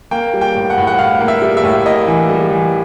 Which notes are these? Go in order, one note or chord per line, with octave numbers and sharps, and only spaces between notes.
A#3 G5
G3
G5
A2
F#5
A2
F#5
A2 F5
A#3
E5
G3
E5
A2
A#3 D#5
E3
G3
E3